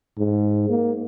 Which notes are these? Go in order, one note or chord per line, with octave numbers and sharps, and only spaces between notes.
G#2
A#3